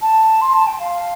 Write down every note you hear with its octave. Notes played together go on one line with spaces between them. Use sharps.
A5
C6
A5
G5
F5